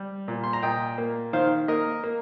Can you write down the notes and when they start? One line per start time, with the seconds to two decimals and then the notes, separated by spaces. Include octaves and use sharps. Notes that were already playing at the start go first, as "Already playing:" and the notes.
Already playing: G3
0.28 A#2
0.44 C6
0.53 A#5
0.63 A#2 D#5 G5
0.98 A#3
1.33 D#3 C5 F5
1.68 A#3 A#4 D#5
2.04 A#3